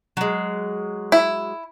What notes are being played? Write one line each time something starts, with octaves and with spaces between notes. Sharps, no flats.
F#3 G#3
E4